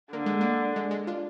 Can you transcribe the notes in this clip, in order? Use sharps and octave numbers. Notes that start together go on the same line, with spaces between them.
D3 A#3
G#3
A#3
G#3
G#3
D4 F4